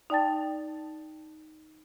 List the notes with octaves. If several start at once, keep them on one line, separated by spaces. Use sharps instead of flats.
D#4 D5 G5 A5 A6